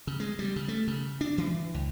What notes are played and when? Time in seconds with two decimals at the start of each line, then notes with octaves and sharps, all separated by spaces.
0.07 C#3
0.20 G#3
0.39 G3
0.56 C#3
0.68 A3
0.88 C#3
1.21 D4
1.38 E3
1.74 C#2